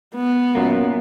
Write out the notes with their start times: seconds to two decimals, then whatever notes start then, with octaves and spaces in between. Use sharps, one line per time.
0.15 B3
0.55 F#2 A#2 A#3